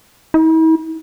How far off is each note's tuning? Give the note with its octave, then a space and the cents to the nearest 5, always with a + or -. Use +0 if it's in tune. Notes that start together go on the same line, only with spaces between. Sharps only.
E4 -45